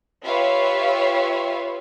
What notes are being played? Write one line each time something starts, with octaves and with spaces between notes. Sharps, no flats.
F4 G4 B4 C#5 E5 F5